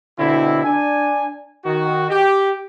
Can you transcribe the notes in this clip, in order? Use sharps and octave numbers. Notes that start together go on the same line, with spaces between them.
B2 D3 C4 E4
D4 G#5
D#3 F#4
G4